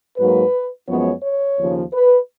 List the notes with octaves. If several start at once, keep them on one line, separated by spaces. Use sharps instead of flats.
G#2 F#3 A#3 B4
F#2 F3 G#3 B3 C#5
C#5
D#2 C#3 F3
B4